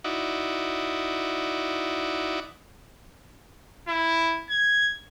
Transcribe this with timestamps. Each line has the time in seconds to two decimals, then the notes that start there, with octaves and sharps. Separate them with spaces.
0.04 D#4 E4 F#4 D5
3.88 E4
4.50 G#6